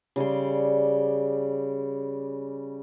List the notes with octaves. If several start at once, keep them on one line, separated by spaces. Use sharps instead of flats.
C#3 G3 D5 C6